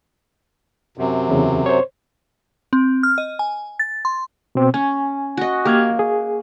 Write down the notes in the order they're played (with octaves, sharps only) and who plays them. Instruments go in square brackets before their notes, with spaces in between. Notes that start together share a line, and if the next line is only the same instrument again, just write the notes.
[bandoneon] F#2 C3
[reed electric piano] E2 C#3
C5 C#5
[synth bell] C4
F6
D#5
G#5
A6
C6
[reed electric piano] B2 C4
[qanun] C#4 [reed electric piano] G#5
[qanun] F#4 D#5
[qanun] A#3 [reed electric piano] G4 F6 G#6
[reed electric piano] G#4